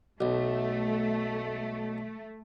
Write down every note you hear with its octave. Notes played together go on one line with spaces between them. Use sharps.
B1 A3